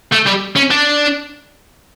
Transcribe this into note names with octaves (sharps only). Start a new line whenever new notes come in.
A3
G3
C#4
D4